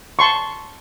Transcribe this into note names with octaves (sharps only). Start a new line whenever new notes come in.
A5 C6 C#6